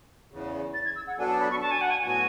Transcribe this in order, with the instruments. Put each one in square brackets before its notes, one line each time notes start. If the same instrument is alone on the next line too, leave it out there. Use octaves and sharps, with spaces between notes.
[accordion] E2 C#3 E3
[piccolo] A6
G#6
E6
F#5
[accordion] B2 F#3 B3 D4 A4 [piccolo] G#5
[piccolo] A5
B5
C#6
A5
G#5
F#5
G#5
[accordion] A2 F#3 B3 F#4 [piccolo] G#5